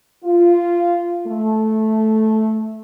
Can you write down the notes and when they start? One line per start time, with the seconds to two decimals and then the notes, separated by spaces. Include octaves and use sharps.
0.25 F4
1.27 A3